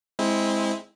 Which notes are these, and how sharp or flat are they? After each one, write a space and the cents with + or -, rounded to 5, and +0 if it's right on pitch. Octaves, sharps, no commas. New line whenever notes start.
G#3 +0 C4 +0 E4 -15